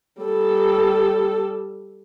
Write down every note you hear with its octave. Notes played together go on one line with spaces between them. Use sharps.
G3 A4